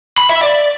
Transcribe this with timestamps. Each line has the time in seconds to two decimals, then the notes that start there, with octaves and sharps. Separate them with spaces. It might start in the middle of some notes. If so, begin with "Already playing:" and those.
0.18 B5
0.30 E5
0.41 D5